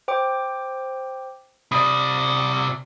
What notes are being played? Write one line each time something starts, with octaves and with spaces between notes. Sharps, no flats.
C5 G5 D6
C3 D5 B5 D#6